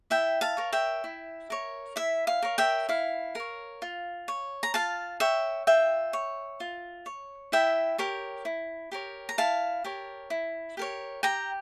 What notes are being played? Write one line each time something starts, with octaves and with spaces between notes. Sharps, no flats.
E4 E5 G5
F5 A5
A#4 C#5
E5 G5
E4
A#4 C#5
E4 E5
F5
A#4 C#5
E5 G5
E4 F5
A#4 C#5
F4
C#5
A#5
F4 F5 A5
C#5 E5 G5
F4 E5 G5
C#5
F4
C#5
E4 E5 G5
G4 A#4 C#5
E4
G4 A#4 C#5
A#5
E4 F5 A5
G4 A#4 C#5
E4
G4 A#4 C#5
G4 G5 A#5